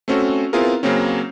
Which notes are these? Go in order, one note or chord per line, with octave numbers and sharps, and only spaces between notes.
A3 C4 C#4 F#4 A4
B3 C4 E4 F4 G#4 A#4
C#3 F#3 A#3 C4 C#4